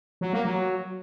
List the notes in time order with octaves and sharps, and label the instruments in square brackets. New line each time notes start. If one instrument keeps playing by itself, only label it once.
[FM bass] F#3
A#3
F#3